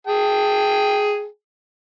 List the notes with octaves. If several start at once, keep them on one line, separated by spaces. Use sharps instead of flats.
G#4 G5 A5